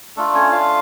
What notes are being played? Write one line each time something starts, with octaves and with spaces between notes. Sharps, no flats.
A3 D4 F4 A4
C#4 C#5
F4 F5